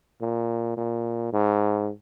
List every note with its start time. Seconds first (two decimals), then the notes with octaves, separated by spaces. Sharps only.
0.21 A#2
0.77 A#2
1.33 G#2